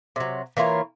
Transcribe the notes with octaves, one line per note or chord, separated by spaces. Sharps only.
C3 F#3
E3 A#3 F4 C#5